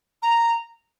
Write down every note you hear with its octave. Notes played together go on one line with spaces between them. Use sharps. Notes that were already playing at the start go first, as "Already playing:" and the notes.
A#5